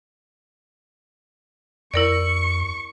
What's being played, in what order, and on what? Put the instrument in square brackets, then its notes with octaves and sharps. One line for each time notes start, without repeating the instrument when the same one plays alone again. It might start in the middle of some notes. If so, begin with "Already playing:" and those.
[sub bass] F2 [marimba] E4 A#4 D5 [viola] C#6